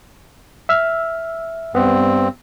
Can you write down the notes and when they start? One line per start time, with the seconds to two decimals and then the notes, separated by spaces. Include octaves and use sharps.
0.69 E5 E6 F6
1.75 G2 B3 C4